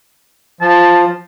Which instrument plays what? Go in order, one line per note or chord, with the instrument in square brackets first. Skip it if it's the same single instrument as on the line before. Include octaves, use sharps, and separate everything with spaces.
[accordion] F3 [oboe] A5